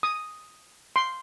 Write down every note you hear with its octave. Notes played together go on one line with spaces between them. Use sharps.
D#6
C6